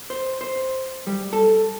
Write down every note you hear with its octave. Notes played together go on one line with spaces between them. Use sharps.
C5
C5
G3
A4